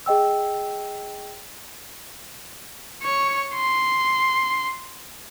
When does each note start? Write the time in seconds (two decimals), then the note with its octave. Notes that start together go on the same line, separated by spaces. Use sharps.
0.06 G#4 D#5 G5 E6
3.02 C#5 C#6
3.55 C6